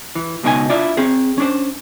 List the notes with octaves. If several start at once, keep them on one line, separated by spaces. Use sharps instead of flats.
E3
C#2 B2 D#4 A#4 G#5
D4 E4 F4 D5
C4 G#4
C#4 D4 C5